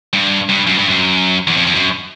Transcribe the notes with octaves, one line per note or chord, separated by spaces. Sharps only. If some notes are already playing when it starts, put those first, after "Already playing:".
G2
G2
F#2
G2
F#2
E2
F2
F2
F#2